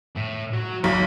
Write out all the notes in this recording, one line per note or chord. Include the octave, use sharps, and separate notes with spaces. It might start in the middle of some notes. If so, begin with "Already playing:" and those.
A2
F#3 F#4
B1 F#3